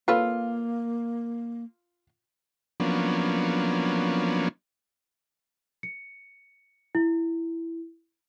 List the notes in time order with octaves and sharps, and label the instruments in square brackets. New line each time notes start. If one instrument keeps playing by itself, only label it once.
[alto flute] A#3 [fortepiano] F4 [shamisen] A4 B4 C#5
[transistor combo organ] F3 F#3 A#3 B3 C#4 D4
[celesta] C#7
E4